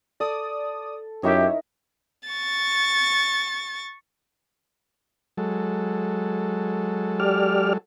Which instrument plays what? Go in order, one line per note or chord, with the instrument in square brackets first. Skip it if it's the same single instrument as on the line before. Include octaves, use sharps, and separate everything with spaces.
[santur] A4 [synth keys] D5 D#6
[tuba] F#2 [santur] D#4 E4 A#4 [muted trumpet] G4 [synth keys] C#5 E5
[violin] C#6 A6
[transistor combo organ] F#3 G#3 A4
[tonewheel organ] G4 D5 F6